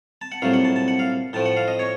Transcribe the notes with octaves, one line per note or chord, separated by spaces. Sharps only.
A5
F#5
C2 A#2 F#3 A3 F5
F#5
A5
A5
F#5
F5
A2 F3 A3 A5
F#5
F5
D#5
C#5